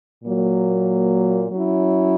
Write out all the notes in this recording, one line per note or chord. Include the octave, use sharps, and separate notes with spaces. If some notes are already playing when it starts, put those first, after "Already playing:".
A#2 F#3 A#3
F#3 C#4 E4